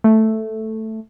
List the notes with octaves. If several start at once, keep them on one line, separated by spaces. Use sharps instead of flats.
A3